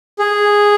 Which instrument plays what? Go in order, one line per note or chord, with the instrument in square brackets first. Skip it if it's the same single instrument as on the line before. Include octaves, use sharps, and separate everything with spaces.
[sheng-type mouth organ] G#4